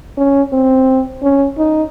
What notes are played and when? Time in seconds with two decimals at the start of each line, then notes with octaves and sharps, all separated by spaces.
0.17 C#4
0.52 C4
1.23 C#4
1.58 D#4